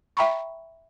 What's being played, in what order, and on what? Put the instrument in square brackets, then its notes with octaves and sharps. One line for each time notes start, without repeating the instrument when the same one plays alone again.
[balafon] E5 G5 A#5 B5 C#6